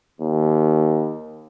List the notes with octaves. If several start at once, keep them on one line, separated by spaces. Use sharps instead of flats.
D#2